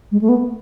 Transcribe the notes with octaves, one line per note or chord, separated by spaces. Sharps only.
G#3
A3
B3